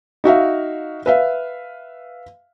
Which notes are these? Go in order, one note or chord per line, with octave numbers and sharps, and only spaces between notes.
D#4 F#4 E5 F5
B4 E5 F5